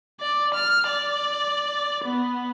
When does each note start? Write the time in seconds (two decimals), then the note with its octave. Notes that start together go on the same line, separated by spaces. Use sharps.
0.20 D5
0.54 F6
0.87 D5
2.04 B3